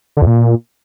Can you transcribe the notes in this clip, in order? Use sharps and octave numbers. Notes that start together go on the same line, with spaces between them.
D3
E2
A#2